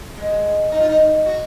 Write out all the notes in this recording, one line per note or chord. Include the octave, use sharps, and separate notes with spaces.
G#3
D#4
F4
D#4
F#4